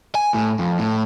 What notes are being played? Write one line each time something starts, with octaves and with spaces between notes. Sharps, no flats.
G#5
A2
F2
A2